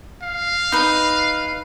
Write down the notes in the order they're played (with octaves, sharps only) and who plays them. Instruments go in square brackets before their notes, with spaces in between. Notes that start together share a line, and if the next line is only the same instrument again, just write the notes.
[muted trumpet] F5
[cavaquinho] D#4 B4